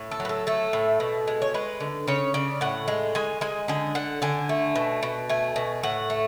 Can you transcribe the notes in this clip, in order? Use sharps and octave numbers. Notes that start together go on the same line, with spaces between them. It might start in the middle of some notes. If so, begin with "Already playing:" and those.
Already playing: A2
A4
F#3
B4
A4
A3 A4
A2
B2
G#3
C#5
G#3 B4
D3
C#3 C#5
C#3 D5
A2 F#5
G#3
G#3 G#5
G#3 G#5
D3 G#5
D3 F#5
D3 G#5
A3
B2
B2
A3 G#5
B2
A2 F#5
A3